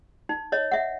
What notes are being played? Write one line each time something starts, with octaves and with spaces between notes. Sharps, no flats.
D#4
C#5 D#5
E5 F#5